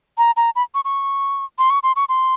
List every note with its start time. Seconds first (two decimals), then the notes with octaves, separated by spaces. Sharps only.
0.18 A#5
0.37 A#5
0.56 B5
0.75 C#6
0.85 C#6
1.58 C6
1.70 C#6
1.83 C6
1.96 C#6
2.09 C6